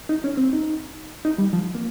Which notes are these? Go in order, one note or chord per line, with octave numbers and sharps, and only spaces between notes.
D#4
C#4
C4
D#4
D#4
G3
F3
A#3